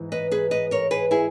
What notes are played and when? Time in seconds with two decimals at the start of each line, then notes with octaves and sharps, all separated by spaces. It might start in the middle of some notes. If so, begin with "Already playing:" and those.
Already playing: G#2 E3
0.12 B4 D#5
0.32 G#4 B4
0.51 B4 D#5
0.71 A#4 C#5
0.91 G#4 B4
1.11 E4 G#4